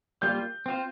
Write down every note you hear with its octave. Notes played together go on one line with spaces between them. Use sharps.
G3 A#3 F4 G6
C4 F4 C5